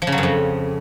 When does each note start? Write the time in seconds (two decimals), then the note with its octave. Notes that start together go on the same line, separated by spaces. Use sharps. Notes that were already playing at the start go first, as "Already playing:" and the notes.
0.02 F3
0.07 C#3
0.12 F#3
0.18 F#2
0.23 F2